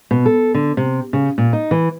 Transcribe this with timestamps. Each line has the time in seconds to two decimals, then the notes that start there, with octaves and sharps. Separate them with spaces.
0.11 B2
0.26 A4
0.54 D3
0.77 C3
1.13 C#3
1.38 A#2
1.53 D#4
1.71 E3